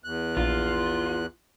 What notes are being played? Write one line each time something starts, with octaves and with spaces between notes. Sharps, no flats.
E2 F#6
A#1 F4